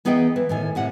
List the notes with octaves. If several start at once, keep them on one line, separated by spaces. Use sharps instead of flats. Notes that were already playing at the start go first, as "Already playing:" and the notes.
E3 B3 D#4 G#4 D#5 G5
E3
A2 D#3 G#5
A2 C3 F#5